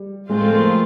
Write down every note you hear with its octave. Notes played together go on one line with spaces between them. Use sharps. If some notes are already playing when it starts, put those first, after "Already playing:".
Already playing: G3
A2 F3 G#3 A3 C4 F4
A#3